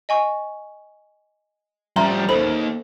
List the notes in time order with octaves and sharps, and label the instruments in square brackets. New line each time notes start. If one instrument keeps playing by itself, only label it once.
[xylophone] D#5 G#5 C#6
[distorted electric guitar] F3 G3 [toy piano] C#4 E5 A#5 [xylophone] C6
[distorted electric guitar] D#2 [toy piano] A4 C5 [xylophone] B5